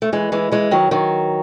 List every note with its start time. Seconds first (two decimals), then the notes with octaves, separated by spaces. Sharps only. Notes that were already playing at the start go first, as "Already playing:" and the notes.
0.02 A3
0.13 E3 G#3
0.32 E3 G#3
0.52 E3 G#3
0.71 D#3 F#3
0.91 D#3 F#3